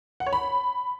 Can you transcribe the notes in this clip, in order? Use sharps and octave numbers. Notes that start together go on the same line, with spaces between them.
F#5
C#5
B5